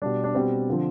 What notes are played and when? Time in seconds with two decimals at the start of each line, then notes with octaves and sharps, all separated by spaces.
0.02 B2 G3 D4
0.24 D4
0.35 B2 G3 C4
0.69 D3 F3